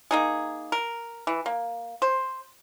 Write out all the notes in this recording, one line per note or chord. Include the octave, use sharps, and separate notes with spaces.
A#3 D#4 G#4
A#4
E3
A#3
C5